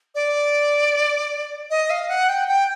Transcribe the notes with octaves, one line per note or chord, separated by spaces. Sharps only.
D5
D#5
F5
F#5
G5
G5